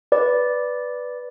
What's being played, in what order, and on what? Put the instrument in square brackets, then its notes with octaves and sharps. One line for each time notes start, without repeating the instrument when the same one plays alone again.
[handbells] B4 D5